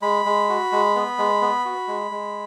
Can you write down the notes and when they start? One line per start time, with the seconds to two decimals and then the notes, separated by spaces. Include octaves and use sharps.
0.02 G#3 B5
0.25 G#3
0.49 F#4
0.72 G#3
0.95 B3
1.18 G#3
1.41 B3
1.65 F#4
1.88 G#3
2.11 G#3